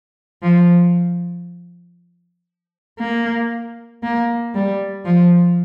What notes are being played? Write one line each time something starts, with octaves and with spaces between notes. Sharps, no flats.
F3
A#3
A#3
G3
F3